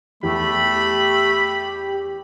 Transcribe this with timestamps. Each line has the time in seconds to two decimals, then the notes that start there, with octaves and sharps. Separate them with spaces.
0.23 E2 A3 G4 B5